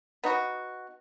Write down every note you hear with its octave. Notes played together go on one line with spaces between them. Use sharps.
B3 D#4 F#4